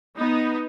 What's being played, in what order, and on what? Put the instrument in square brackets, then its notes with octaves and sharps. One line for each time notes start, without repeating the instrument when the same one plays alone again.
[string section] B3 D#4